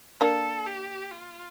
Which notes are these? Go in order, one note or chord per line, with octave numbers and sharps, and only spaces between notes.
A#3 D4 A4
G4
F4